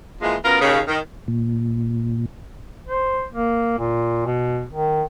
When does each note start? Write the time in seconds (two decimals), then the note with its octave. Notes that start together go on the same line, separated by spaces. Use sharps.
0.22 A#2 E3 F3 G#3
0.45 F#2 B3 F4 A#4
0.61 D#2 C#3
0.88 D#3
1.28 A#2
2.87 C5
3.32 A#3
3.79 A#2
4.26 B2
4.72 D#3